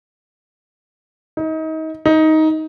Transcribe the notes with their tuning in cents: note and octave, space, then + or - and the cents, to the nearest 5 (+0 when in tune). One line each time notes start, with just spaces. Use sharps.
D#4 +30
D#4 +15